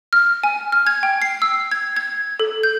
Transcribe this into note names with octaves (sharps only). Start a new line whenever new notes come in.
F6
G#5
F6
G#6
G5
C7
E6
G#6
G#6
A4
G6